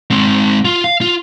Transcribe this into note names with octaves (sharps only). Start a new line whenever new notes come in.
G#3 C4
F4
F5
F4